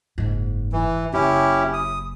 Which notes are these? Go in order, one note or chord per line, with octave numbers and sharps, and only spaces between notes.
F#1 G#2
E3
F#1 C#4 E4 G4
D#6